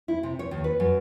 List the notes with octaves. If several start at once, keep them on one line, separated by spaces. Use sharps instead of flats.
E4
C3
C#5
D#2
B4
F#2